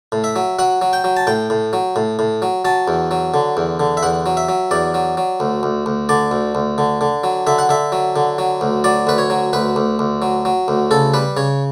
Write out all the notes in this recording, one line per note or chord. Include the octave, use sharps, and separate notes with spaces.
A2
E5
F#3
F#3 F#5
F#3
G5
F#3
A5
A2 G5
A2
F#3
A2
A2
F#3
F#3 A5
E2
F#3
D3
E2
D3
E5
E2 F#5
F#3
E5
F#3
E2 D5
F#3
F#3
D2
D2
D2
D3 D5
D2
D2
D3
D3
F#3
D3 E5
F#5
D3 E5
F#3
D3
F#3
D2
F#3 D5
D2 B4
C#5
F#3
D2 B4
D2
D2
F#3
F#3
D2
C#3 A4
G3 B4
C#3 C#5